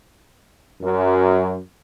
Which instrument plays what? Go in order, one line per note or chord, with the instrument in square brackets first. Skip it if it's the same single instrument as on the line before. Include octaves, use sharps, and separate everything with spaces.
[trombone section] F#2